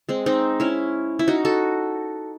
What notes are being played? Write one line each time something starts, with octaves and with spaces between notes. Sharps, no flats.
G#3 C4
C4 D#4
C#4 E4
E4
D#4 F#4
F#4 A4